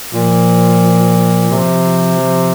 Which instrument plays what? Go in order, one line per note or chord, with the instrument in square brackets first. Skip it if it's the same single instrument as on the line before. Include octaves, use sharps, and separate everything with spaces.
[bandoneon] A#2 [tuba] F3
[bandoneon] C3 [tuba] F3
[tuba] F3